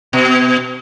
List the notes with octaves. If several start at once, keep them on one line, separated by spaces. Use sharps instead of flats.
B2